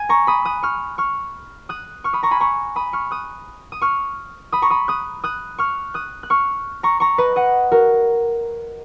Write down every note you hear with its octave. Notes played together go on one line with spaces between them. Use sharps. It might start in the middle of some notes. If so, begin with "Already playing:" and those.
Already playing: G#5
A#5 C#6
B5 D#6
D#6 F#6
C#6 F6
C#6 F6
D#6 F#6
C#6 F6
B5 D#6
A#5 C#6
G#5 B5
A#5 C#6
B5 D#6
C#6 F6
D#6 F#6
D#6
C#6 F6
B5 D#6
A#5 C#6
B5 D#6
D#6 F#6
D#6 F#6
C#6 F6
D#6 F#6
F#6
C#6 F6
A#5 C#6
A#5 C#6
B4 D#5
D#5 F#5
F#4 A#4